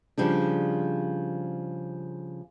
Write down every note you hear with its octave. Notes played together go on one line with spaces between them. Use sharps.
C#3 F3 G3 D4